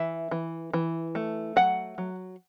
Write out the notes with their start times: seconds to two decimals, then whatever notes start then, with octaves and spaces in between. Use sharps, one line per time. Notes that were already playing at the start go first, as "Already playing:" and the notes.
Already playing: E3 E5
0.31 E3
0.73 E3
1.15 A3
1.56 F#3 F#5
1.98 F#3